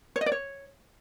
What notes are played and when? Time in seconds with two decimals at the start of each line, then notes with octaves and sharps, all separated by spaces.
0.16 C#5
0.21 D#5
0.26 D5
0.32 C#5